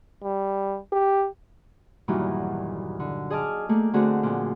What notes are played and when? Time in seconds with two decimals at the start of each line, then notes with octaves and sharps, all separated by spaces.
0.23 G3
0.92 G4
2.08 E2 G2 A#2 D#3 E3 F#3
3.00 D3
3.30 G#4 D#5 G#5 A5 D6 F6
3.69 A3 A#3 G#4
3.93 D3 A3 C4 D4 F#4 G#4
4.23 A#2 F3